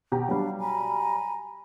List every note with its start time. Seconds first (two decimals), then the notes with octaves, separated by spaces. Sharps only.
0.12 B2 G4 A#5
0.29 F#3 G3 D4 F5
0.59 G#5 A#5 B5